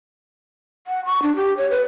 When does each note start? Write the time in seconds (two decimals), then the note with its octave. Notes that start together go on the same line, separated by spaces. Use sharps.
0.87 F#5
1.05 C#6
1.22 D4
1.36 G4
1.57 C#5
1.71 B4